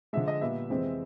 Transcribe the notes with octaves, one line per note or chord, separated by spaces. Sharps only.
D3 F3 G#3 E5
D#5
A#2 G3 B3 E5
F2 C3 E3 G#3 C4